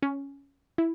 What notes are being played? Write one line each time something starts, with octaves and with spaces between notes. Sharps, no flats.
C#4
E4